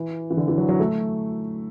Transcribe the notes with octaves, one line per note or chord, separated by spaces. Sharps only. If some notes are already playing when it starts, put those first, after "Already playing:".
Already playing: E3
E3
D3
E3
F#3
F#3
A3